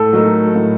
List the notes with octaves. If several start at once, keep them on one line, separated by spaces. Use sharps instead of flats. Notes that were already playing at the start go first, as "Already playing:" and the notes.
Already playing: A2 A4
F#3 A3 D#4 A#4
A2